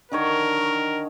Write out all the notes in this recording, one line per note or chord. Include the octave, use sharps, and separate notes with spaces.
D3 D#3 A#4 C#5